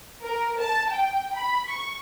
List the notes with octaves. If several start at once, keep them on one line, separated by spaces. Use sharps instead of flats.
A#4
A5
G5
B5
C#6